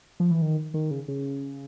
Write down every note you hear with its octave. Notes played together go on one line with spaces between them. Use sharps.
F3
E3
D#3
D#3
C#3
C#3